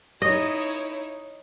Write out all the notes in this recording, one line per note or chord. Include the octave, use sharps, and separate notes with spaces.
D#4 E4 C#5 D#5